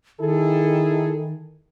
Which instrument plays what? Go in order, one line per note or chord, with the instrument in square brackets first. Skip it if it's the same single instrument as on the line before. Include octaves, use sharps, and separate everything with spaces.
[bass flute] D#3 [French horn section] E4 G#4 A4